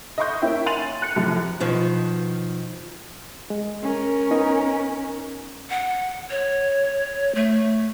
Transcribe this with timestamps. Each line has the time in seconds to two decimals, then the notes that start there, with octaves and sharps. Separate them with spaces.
0.18 D#5 E5 C6 C#6 G6
0.42 A#3 C#4 D#4 E4 E5 G5
0.66 G#5 C6 A6 D#7 F7 F#7
1.02 F#6 C#7
1.16 F#2 A2 C3 F3
1.60 B2 D#3 F3
3.50 G#3
3.82 C#4 A#4
4.31 B3 D#4
5.70 F#5
6.30 C#5
7.35 A3